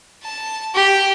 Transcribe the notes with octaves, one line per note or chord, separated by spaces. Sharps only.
A5
G4